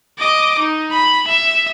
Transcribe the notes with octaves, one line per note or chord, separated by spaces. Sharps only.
D#5 D6
D#4
B5
E5